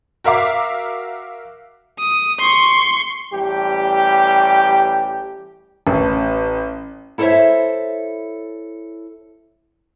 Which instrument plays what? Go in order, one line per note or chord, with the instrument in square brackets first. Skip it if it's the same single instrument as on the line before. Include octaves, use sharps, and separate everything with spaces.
[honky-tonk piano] F#4 A#4 E5 F5 D6
[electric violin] D#6
C6 C#6
[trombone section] A1 G3 G4
[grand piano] A1
[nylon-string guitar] E4 A4 A#4 C5 C#5 E5